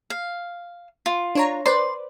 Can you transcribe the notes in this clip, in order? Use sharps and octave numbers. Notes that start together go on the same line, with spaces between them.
F5
F4
D4 C#5 A#5
B4 C5 D5 C6